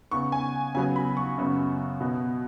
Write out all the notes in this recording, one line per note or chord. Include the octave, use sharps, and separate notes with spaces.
C#3 B3 C#6
G#5
C#3 F#3 B3 G#5
B5
C#6
F#2 C#3 B3
B2 B3